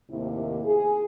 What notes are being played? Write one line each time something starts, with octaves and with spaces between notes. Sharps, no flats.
D#2 A2 C3 A#3 E4
G#4